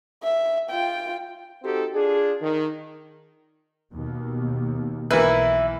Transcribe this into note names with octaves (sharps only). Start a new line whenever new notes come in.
E5
F4 G5
C4 D#4 F#4 G4 A4
D4 F4 G#4
D#3
D#2 B2
B1 E3 A#3 E4 B4